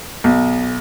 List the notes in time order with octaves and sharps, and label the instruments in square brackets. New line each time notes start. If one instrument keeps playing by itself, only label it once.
[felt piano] B1